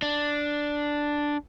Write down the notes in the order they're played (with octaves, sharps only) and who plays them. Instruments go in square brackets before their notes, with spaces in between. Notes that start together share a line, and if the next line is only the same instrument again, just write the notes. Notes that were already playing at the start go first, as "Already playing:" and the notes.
[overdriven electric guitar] D4